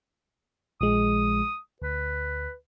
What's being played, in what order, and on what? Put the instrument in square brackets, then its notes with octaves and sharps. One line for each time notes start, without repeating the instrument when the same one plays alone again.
[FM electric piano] A#1 F3 G#3 [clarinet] D#6
[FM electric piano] D2 [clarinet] B4